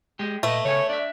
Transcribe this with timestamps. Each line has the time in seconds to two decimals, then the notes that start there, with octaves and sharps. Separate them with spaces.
0.19 G#3 G4
0.43 A#2 A3 B4 D#5
0.65 C#3 A4 C#5 G#5
0.89 D4 D5 E5